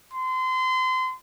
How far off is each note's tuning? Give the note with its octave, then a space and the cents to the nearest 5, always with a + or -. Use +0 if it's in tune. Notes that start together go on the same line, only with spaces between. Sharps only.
C6 -30